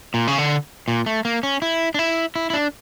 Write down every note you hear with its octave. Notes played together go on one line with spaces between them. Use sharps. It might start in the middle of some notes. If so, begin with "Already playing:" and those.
A#2
C#3
D3
A#2
A3
A#3
C#4
E4
D4
E4
E4
E4
D4